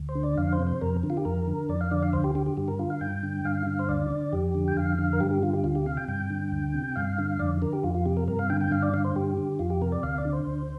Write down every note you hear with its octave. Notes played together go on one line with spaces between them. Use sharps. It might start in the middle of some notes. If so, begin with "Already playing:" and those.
Already playing: D2
C5
D3
D5
F2 F5
C5
C3
C5
F2 A#4
D3
F4
G4
F2 A#4
D3
F2 D5
F5
D3 D5
F5
D2 C5
G4
D3 G4
G4
G2 G4
A#4
D3 F4
F5
G2 G5
D3
G2 F5
D3
C5
D2 D5
D3
F2 G4
D3
G5
F2 F5
D3
A#4
G2 G4
G4
D3 F4
G4
D2 F4
G4
C3 F5
G5
G2 G5
D3
D2
C3
G2 F5
D3
F2 D5
D3 A#4
G4
F2 F4
F4
C3 G4
A#4
G2 A#4
F5
D3 G5
G5
G2 F5
D5
D3 F5
C5
G2 G4
D3
F2 F4
G4
C3 A#4
D5
D2 F5
D5
D3
C5
D2